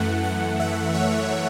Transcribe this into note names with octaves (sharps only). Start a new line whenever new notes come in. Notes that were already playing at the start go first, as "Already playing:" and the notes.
Already playing: F#2 E3 A3 F#5
F#5
E5
C#5